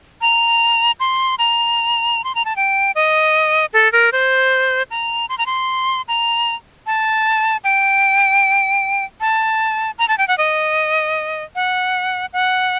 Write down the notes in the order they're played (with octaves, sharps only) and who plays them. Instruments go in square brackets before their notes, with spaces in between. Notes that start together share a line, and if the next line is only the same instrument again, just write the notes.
[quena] A#5
C6
A#5
C6
A#5
A5
G5
D#5
A4
A#4
C5
A#5
C6
A#5
C6
A#5
A5
G5
A5
A#5
A5
G5
F#5
D#5
F#5
F#5